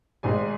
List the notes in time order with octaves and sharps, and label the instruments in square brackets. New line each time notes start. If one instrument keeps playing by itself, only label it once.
[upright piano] G#1 G#2 G#3 G#5